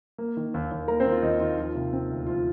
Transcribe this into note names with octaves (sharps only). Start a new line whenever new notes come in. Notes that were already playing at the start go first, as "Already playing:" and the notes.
A#3
D#3
D#2
D#2
A#3 A#4 A#5
C4 C5
D#3
F4
D#2 D#4
D#2 F4
F3 F4
C3
C4
D2
F3 F4